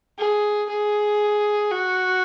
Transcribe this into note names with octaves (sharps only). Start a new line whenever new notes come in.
G#4
G#4
F#4